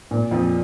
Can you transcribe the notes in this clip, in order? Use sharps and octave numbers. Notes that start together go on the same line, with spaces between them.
A#2
F2 F3